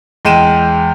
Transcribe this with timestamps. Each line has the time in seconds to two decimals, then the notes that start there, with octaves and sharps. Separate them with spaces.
0.25 E2 G#3 G5 D#7 E7